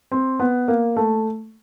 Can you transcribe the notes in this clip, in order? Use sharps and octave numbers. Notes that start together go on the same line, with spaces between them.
C4
B3
A#3
A3